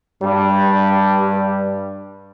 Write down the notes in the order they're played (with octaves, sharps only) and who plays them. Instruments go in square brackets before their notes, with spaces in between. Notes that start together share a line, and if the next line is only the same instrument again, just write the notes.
[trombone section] G2 G3